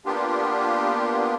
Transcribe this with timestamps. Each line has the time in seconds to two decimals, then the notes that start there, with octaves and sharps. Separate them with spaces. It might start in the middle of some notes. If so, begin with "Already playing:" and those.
0.05 A#3 B3 D4 F4 G4